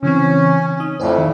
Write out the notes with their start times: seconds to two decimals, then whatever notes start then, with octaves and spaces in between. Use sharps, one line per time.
0.03 C#3 E3 C4 C#4
0.80 D#4 D#6
1.00 F2 A2 C5 D5 G#5
1.18 D#3